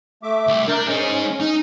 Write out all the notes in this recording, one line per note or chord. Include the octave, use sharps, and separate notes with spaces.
A3 E5 D6
C2
D4 A#4 G6
G#3 C#4 D#4
D#4